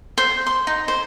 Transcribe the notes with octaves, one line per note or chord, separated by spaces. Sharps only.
C5
C6
D#4
C5